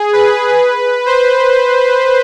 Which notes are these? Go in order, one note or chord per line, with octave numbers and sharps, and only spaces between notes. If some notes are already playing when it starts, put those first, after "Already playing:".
Already playing: G#4
B4
C5